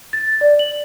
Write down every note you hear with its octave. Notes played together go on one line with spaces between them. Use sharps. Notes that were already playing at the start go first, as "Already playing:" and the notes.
A6
D5
F#7